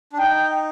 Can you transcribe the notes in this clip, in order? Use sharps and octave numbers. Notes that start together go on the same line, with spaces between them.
D4
D#4 G5